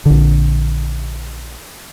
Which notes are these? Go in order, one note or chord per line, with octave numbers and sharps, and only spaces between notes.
A#1 D3